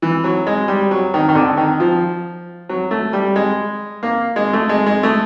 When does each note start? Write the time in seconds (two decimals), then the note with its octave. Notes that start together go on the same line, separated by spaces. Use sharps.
0.02 E3
0.24 F#3
0.47 G#3
0.68 G3
0.91 F#3
1.14 D#3
1.29 D#3
1.35 D3
1.57 D#3
1.80 F3
2.69 F#3
2.91 A3
3.13 G3
3.36 G#3
4.03 A#3
4.36 G#3
4.53 A3
4.69 G#3
4.86 G#3
5.03 A3